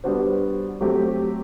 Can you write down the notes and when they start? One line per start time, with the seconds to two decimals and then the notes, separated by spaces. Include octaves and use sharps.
0.04 G3 B3 D4 F#4 C5
0.81 F#3 A3 C4 G4